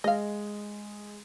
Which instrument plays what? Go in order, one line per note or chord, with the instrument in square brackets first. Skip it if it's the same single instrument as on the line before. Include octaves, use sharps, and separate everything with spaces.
[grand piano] G#3 [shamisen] D#5 F5